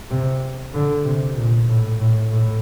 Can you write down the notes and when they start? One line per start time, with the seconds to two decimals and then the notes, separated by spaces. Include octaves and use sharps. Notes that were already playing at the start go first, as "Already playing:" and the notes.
0.11 C3
0.74 D3
1.05 C3
1.36 A#2
1.68 A2
2.00 A2
2.31 A2